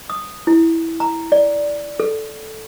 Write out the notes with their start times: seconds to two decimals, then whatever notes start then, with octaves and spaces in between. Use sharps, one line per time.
0.10 D#6
0.47 E4
1.00 A#5
1.32 D5
2.00 A4